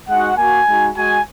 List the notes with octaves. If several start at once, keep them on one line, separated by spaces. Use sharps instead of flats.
G#3 D#4 F#4 F#5
A#3 F#4 G#5
G#3 D#4 F#4
G#3 F#4 G#5